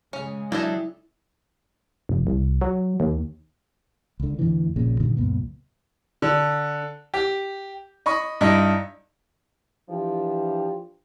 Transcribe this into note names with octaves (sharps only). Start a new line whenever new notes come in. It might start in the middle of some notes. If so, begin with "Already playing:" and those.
C#3 G#3 C#4
F#3 D4 E4 G4 A4 D#5 E5
F1
C2
F#3
D#2
C#2 D3
E2 A2 D3 E3
A#1 A#2 C#3
G2 A#2 D3 D#3
C#2 F#2 A#2 B3
D3
G4
D#5 B5 C#6
G2 D#4 E4 D#5
E3 F3 D4 G4